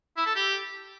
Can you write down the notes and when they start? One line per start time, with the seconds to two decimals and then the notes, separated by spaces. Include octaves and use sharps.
0.17 E4
0.26 A4
0.36 G4